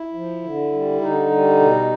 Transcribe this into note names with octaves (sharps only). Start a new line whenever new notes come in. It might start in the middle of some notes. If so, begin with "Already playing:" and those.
Already playing: E4
F3
D3
G3
D3 D#4
G3
B2